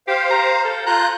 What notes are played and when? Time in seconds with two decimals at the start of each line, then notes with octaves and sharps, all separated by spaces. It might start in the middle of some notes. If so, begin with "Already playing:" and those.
0.07 G4 C5 F5
0.30 A#5
0.65 A4
0.86 F4 A#5 F#6 G6